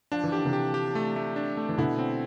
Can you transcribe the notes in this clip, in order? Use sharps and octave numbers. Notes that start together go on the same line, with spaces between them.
F3 D4
E3
D3 G4
C3 E3
G4
G4
A3
A3
D4
A3
E3
B2 D3 E4
C4